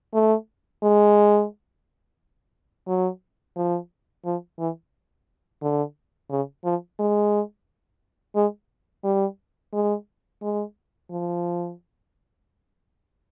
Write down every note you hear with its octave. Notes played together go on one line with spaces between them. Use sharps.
A3
G#3
F#3
F3
F3
E3
D3
C#3
F3
G#3
G#3
G3
G#3
G#3
F3